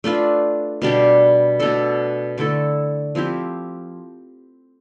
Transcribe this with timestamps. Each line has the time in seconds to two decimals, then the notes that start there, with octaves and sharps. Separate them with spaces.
0.04 A3 D4 F4 B4
0.82 B2 G3 D4 G4
1.60 B2 A3 D4 A4
2.38 D3 A3 E4 A4
3.15 F3 C4 E4 G4